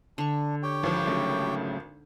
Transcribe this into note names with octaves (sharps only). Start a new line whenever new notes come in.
D3 D4 C#6
G4 C#5 G5
G#1 F3
C#3 F#3 A3